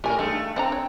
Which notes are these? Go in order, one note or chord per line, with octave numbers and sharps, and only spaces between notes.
A2 G4 A#4 G#5
G2 G#3 A3 D#4
F3 C4 D4 A#5
C#5